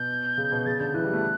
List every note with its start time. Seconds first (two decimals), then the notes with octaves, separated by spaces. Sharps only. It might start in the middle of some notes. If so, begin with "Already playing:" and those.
Already playing: B2 G6
0.38 C#3
0.52 B2
0.66 C#3 A6
0.80 D3 G6
0.94 E3 F#6
1.04 G3
1.13 A3